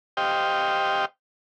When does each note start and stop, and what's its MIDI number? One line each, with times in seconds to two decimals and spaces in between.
0.17 1.05 67
0.17 1.05 72
0.17 1.05 75
0.17 1.05 77
0.17 1.05 79